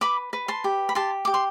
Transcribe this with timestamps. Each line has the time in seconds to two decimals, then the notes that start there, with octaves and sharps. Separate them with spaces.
0.01 B4 B5 D6
0.33 B4
0.48 A5 C6
0.64 G4
0.89 B5
0.95 G4 A5 C6
1.25 G4 D6
1.34 C6